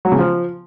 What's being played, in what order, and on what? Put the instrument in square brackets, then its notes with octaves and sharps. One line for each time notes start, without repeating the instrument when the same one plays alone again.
[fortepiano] F#3
C#3
F3